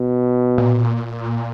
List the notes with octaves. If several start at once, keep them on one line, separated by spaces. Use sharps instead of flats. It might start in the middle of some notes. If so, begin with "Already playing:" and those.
Already playing: B2
A#2